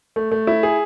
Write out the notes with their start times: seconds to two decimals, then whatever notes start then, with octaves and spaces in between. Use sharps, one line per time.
0.16 A3
0.31 A3
0.47 E4
0.63 G#4